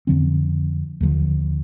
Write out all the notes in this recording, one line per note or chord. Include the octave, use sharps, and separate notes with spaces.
F2 D3 F3 C4
D#2 D3 F3